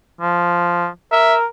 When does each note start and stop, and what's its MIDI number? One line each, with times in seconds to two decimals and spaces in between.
0.21 0.88 53
1.12 1.45 70
1.12 1.36 76